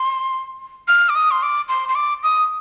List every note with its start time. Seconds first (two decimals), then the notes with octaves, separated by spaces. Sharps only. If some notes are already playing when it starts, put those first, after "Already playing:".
Already playing: C6
0.88 F6
1.09 D6
1.15 D#6
1.31 C6
1.43 D6
1.69 C6
1.89 C6
1.95 D6
2.23 D#6